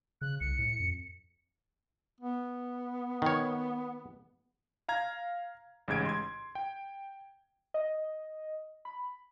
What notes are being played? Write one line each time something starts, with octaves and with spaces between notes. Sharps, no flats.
C#3 F#6
C2 C#7
A2
F2
B3
D#3 C#5
F5 A#5 G#6
A1 G#2 C#3 G#6 D7
C6 G#6
G5
D#5
B5